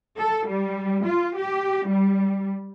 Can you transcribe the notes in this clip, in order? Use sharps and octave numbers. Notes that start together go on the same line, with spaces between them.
A4
G3
F4
G4
G3